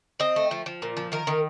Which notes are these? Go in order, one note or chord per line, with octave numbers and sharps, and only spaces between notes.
C4 D#5
A3
F3
F3
A#2
F3
D#3 A#4
D#3